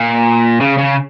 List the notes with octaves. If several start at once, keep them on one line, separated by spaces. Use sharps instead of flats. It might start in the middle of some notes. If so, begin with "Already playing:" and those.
Already playing: A#2
C#3
C#3